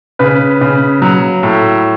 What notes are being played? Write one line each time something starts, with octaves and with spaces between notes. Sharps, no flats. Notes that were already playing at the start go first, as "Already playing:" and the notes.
C#3 B4
C#3
F#3
A2